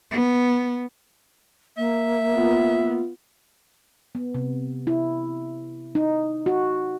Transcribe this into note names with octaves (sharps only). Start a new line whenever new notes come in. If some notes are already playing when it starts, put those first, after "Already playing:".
B3
A#3 E5
B3 F4
B3
C3
E4
D#4
F#4